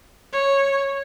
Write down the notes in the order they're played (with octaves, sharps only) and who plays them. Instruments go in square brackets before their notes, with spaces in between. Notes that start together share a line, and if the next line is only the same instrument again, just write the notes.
[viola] C#5